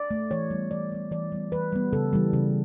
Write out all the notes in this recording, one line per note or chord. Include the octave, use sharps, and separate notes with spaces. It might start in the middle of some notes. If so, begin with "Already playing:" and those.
Already playing: D5
A3
E3 C#5
G3 B3
E3 D5
G3 B3
E3 D5
G3 B3
E3 B4
G3 B3
C#3 A4
E3 G3
C#3